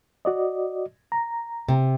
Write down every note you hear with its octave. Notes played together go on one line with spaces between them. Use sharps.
F#4 D5 D#5
A#5
C3